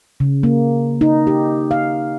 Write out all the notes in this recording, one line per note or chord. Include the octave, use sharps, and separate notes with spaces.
C#3
A#3
D#4
G4
F5